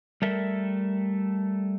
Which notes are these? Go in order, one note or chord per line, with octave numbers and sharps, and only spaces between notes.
G3 A3 A4 A#4 E5